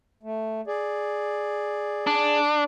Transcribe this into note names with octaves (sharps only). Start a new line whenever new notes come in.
A3
G#4 D5
D4